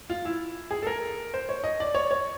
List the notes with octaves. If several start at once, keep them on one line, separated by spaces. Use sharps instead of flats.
F4
E4
G#4
A4
A#4
C5
C#5
D#5
D5
C#5
C#5